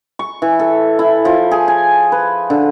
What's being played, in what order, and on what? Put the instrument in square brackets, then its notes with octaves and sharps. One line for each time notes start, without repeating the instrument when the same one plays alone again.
[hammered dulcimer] C#6
E3
A4
E4
F3
G#4
G#5
B4
D3